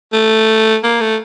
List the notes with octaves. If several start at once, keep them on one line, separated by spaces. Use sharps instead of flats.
A3
A#3
A3